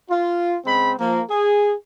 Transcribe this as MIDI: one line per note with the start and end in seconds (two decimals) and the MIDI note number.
0.10 0.58 65
0.66 0.93 49
0.66 0.93 56
0.66 0.93 60
0.66 0.93 83
0.99 1.21 53
0.99 1.21 58
1.29 1.73 68